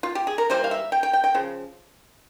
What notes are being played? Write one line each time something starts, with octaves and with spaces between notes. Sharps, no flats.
F4
G4
G#4
A#4
E3 G3 A#3 C5
F5
E5
G5
G5
G5
G5
C#3 F3